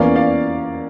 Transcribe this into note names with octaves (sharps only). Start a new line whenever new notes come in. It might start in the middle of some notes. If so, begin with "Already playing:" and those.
Already playing: E2 E3 A#3 C#4 D5 F5
D5 F5